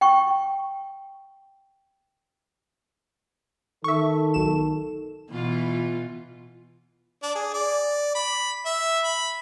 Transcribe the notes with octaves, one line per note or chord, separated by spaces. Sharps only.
G5 C#6
D#3 A4 E5 C#6
B1 E7
B2 E3 F4
D4
G#4
D5
B5
E5
B5